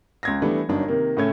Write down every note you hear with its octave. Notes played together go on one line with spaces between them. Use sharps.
C#2 G#6 A#6
E3 G3 A3 B3 D4
G1 F#2 D4 D#4
C3 D#3 A#3
A2 C#3 A3 C#4 G#6